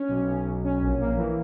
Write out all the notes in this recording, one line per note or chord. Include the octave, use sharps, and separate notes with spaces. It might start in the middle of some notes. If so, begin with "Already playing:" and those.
Already playing: C#4
B1
B1
B1
C#4
A#1
A#3
E3